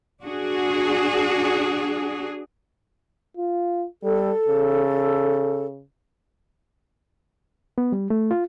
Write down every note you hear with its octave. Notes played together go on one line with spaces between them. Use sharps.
D4 F#4 G#4
F4
G3 A4
C#3
B3
G3
A3
F4